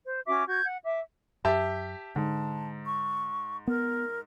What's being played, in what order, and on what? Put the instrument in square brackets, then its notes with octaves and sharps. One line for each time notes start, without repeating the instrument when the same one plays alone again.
[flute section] C5
C#4 F#4 E5 D6
F#4 G6 G#6
F#5
E5 D6
[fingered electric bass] F#2 [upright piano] G4 E5 A5
[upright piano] G#2 [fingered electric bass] D3 [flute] A5
[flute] C#6
[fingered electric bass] B3 [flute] A#4